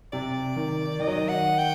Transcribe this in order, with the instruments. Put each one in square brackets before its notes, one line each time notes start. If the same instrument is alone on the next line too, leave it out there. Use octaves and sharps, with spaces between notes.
[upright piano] C3 [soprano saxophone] D5
[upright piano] D#3
[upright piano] D#3 [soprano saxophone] D#5
[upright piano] F#3
D#3
[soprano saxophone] F#5
G5